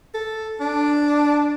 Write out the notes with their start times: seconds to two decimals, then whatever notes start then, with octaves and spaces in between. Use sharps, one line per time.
0.14 A4
0.60 D4